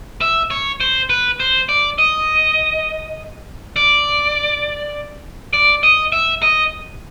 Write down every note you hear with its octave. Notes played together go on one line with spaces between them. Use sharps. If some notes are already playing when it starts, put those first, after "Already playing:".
E5
C#5
C5
B4
C5
D5
D#5
D5
D5
D#5
E5
D#5